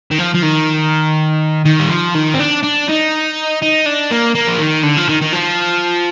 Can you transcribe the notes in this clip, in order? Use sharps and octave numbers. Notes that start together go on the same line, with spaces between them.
D#3
F3
F3
D#3
D#3
G3
F3
D#3
C4
D4
D4
D#4
D#4
D4
A#3
A#3
F3
D#3
D3
F3
D#3
D#3
F3